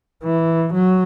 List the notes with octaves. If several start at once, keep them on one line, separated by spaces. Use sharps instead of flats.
E3
F#3